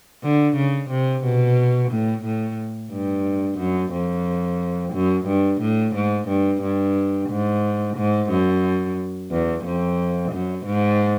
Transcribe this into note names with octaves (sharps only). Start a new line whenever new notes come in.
D3
C#3
C3
B2
A2
A2
G2
F#2
F2
F#2
G2
A2
G#2
G2
G2
G#2
G#2
F#2
E2
F2
F#2
G#2